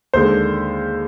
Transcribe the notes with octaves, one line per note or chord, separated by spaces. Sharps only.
D#2 D3 G#3 C5